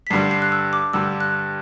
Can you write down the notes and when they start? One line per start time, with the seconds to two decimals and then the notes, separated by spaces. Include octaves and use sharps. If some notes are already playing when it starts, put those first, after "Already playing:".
0.07 B6
0.10 G2 D3 G3 C7
0.31 C7
0.42 F#6
0.52 E6
0.73 D6
0.93 G2 D3 G3 E6
1.20 F#6